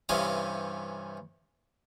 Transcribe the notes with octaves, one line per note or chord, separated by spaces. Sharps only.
G2 C3 E3 C#4 F5 D#6